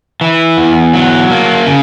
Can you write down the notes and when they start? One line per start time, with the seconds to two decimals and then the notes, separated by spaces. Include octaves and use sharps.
0.21 E3
0.57 E2
0.94 F#3
1.30 A#3
1.67 C#3